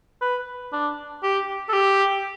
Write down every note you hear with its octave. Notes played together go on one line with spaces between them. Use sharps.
B4
D4
G4
A4
G4